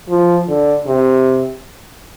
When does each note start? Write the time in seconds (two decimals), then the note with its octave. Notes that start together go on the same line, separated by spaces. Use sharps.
0.09 F3
0.48 D3
0.87 C3